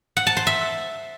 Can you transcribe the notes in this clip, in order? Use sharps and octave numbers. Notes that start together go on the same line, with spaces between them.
F#5
A5
C5
E5